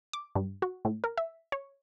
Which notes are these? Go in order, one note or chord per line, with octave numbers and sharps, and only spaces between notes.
D6
G2
F#4
A2
A#4
E5
C#5